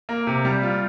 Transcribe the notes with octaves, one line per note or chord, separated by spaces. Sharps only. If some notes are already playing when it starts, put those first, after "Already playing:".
A#3
C3
G3
F4